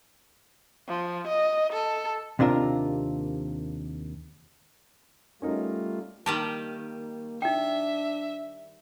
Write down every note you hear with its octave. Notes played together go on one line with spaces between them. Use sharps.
F3
D#5
A4
D#2 C3 D4 F4 A#4
G3 A3 C#4 D#4 F4 A#4
D#3 G3 A#3 G4 A5
D4 D#4 E5 G5